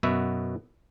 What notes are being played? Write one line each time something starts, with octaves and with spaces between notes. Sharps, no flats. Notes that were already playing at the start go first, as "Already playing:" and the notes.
F#2 B2 B3 F#4 E5